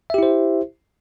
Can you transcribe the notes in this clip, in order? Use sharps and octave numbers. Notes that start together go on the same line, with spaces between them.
E4 G4 C5 E5